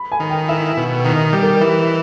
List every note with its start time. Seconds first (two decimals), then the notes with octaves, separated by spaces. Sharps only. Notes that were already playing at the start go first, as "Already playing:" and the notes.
Already playing: B5
0.12 G#5
0.20 D#3
0.30 G5
0.49 E4 E5
0.77 B2
1.05 D#3 D#5
1.33 G3
1.42 A#4
1.61 E3